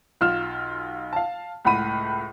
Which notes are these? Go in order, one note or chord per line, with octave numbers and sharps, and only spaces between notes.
B1 F4 F6 E7
F5 A5
C#2 A2 F#5 B5 D#7